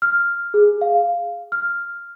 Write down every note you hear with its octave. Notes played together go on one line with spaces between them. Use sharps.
F6
G#4
F5
F6